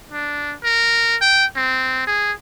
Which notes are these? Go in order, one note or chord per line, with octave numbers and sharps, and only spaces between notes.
D4
A#4
G5
C4
G#4